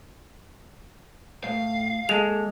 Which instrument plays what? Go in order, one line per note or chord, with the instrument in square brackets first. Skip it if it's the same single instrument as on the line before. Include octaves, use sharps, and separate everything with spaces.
[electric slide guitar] A2 [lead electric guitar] F5
[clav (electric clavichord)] G#3 [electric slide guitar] A#3 A4 [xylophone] F7